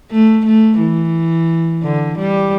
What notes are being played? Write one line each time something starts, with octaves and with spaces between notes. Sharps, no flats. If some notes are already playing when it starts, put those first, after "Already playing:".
A3
A3
E3
D3
G3